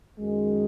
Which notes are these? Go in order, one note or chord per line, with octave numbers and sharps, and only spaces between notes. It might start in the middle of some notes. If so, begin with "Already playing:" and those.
F#2 D#3 G#3